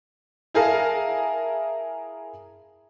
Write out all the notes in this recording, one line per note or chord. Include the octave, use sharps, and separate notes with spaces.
E4 G#4 A#4 F5 A5